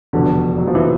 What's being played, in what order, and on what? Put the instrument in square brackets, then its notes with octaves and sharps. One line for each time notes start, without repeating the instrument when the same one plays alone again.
[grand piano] F1 E2 B2 [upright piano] D3
[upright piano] F#3
F3
E3